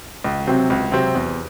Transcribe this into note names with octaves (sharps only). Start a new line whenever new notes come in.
C#2
C3 F#3 C4
C#2
C3 F#3 C4
E2